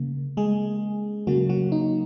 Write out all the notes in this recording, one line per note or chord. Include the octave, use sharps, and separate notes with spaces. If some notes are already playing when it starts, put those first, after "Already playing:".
Already playing: C#3 A#3
G#3 G#4
C#3 F#3 A#3 F#4
F#3 F#4
D#4